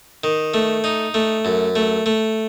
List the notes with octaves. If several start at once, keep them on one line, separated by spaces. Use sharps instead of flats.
D#3
A3
D#4
A3
F#2
A3
A3